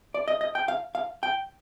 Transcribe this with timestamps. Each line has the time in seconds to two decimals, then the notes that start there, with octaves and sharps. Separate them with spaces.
0.14 D5
0.28 D#5
0.41 D#5
0.55 G5
0.68 F5
0.95 F5
1.23 G5